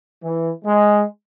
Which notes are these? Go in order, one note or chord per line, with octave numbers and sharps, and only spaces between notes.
E3
G#3